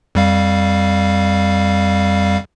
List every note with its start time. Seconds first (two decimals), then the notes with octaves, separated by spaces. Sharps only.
0.15 F2 G3 F5